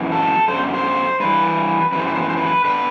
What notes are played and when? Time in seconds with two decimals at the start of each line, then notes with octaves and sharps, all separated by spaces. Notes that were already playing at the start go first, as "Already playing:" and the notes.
Already playing: F#2 E3
0.12 A4
0.48 F#2 D3 C5
0.74 C5
1.20 G2 E3 B4
1.92 F#2 B4
1.96 E3 C5
2.07 B4
2.15 C5
2.22 B4
2.29 C5
2.37 B4
2.65 D3 B4